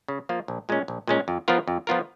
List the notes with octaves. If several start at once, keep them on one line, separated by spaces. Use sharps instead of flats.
C#3
F3 A#3 F4
A#1
A#2 G#3 C#4
A#1
A#2 G#3 C#4
F2
F3 B3 F4 A#4
F2
F3 B3 F4 A#4